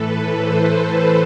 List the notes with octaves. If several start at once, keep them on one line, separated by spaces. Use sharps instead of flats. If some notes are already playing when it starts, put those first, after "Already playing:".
Already playing: A2 E3 A4 B4
C5